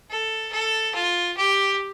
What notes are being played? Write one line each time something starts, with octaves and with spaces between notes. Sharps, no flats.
A4
A4
F4
G4